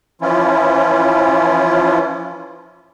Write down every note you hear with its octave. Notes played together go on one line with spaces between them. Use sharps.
E3 F3 C#4 E4 F4